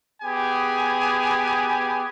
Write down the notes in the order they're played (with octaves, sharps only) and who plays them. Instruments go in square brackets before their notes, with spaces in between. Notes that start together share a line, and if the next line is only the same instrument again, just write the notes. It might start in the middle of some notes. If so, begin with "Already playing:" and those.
[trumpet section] B3 G4 G#4 G#5